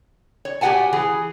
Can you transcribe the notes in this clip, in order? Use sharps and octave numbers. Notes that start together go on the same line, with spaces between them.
C#5
A#2 F#4 G4 F#5 G#5 A5
E3 G#4